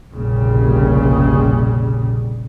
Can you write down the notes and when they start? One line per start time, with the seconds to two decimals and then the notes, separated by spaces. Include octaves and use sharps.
0.13 F1 A#1 A#2 C#3 G3